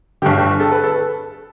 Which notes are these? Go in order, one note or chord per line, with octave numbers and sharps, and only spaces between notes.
G1 G2 D3 G4
A4
B4
A4